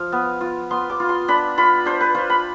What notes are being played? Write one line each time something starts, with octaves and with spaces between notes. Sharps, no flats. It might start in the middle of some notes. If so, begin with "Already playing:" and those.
Already playing: F3 F5
B3
F4
B3 C6
D6
F4
C6
D4 B5
F4 B5
D4 C5
B4
F4 C5
B5